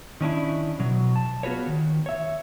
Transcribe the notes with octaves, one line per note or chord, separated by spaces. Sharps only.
D#3 C#4 D4 E4
B2 F#3
A5
B3 F4 F#4 G#4 B4 C#5
D#3
C#5 E5